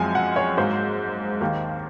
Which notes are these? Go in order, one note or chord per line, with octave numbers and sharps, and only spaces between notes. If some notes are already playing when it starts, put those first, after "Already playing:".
Already playing: F#2 F3 G#3 C4 G#5
F#5
C#5
G#2 F#3 A#3 C5
D#2 D#3 A#3